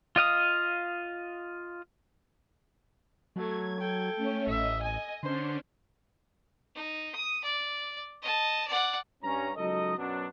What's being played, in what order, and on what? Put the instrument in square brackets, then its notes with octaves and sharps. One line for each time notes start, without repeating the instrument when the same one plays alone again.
[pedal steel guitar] F4 D#5 F5 D#6
[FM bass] F#3 [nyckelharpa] A3 [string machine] G#6
[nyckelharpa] A4 G5
[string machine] A3 C#4 C#5
[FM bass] A1 [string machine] D#5 [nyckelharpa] E5
[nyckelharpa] G#5
[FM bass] D3 [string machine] C#4 D4 [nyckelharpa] C5
[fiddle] D#4
D#6
D5
D#5 A5
D5 F#5
[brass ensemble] G2 C#4 A#5
C#2 F#3 D#4 A4 D#5
F#2 B2 F#3 D4